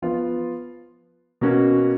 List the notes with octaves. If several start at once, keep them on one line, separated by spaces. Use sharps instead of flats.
F3 B3 F4
B2 A#3 C#4 F#4